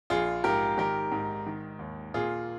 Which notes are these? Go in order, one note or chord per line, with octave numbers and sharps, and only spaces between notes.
A#1 F4 G#4
G#2 G4 A#4
D#3 G4 A#4
G#2
D#3
D#2
A#2 F4 G#4